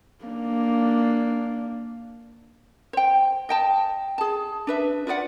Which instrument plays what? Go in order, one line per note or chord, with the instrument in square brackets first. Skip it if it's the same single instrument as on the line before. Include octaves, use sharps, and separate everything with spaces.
[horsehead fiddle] A#3 D4
[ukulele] C5 G5
D#5 G5 A5
G#4 A5
D4 B4 E5
F4 B4 D5 F#5